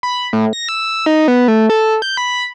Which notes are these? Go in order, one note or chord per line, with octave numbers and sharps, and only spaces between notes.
B5
A2
A#6
E6
D#4
B3
A3
A4
G6
B5